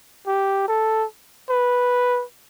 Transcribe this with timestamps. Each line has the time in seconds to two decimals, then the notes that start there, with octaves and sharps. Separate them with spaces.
0.27 G4
0.68 A4
1.50 B4